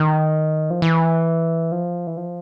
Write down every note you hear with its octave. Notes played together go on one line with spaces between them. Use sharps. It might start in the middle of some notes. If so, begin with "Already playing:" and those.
Already playing: D#3
F3
E3
F3
E3
F3